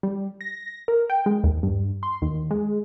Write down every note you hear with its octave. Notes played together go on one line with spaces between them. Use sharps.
G3
A#6
A#4
G5
G#3
D#2
G2
C6
D#2
G#3